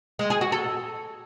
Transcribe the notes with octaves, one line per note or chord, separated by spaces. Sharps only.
G#3
G#4
F#4
A4